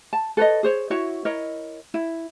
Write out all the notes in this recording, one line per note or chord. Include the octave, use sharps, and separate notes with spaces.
A5
A4 B4 C#5 D#5
G#4 C5 C#5
E4 F#4 C#5 E5
E4 A#4 C#5 D#5
E4